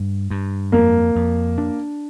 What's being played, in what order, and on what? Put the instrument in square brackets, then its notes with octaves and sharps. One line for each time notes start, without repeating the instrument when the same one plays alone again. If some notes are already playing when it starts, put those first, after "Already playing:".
Already playing: [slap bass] G2
G2
[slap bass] F2 [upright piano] A#3
[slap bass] F2
D4